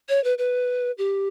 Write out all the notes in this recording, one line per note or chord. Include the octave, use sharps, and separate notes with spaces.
C#5
B4
B4
G4